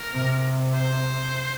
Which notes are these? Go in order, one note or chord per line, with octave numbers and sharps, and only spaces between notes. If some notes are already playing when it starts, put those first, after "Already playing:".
Already playing: A#4
C3
C5